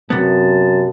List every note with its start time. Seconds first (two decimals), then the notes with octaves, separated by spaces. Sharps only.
0.10 F#2 C3 B3 A5